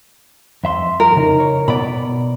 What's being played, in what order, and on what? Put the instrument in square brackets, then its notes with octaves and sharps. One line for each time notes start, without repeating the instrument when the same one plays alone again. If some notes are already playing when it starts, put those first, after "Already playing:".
[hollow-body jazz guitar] F2 E5 C6
[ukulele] A#4
[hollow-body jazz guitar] C#3 D#4
C#5
[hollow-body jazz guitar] B2 D5 [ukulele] B5